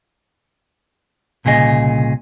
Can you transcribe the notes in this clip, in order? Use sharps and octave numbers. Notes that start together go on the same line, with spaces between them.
C2 A#2 C#3 G#4 D#5